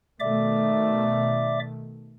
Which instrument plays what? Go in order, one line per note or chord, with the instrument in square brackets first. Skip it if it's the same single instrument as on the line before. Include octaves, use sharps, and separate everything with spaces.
[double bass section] B2 D#3 A3 [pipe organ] D5 E5 D6